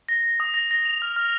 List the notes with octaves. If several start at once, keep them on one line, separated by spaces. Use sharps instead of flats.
A#6
A#6
D#6
A#6
A#6
F7
F6
F6